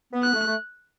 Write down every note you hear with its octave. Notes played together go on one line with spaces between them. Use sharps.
B3
F#6
A3
A3